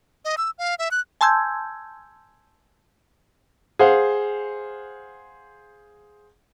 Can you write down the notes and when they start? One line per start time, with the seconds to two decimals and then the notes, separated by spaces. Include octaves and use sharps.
0.25 D#5
0.38 E6
0.58 F5
0.79 E5
0.91 F#6
1.21 G#5 A5 C6 E6 G6 G#6
3.79 G#4 C5 F5 F#5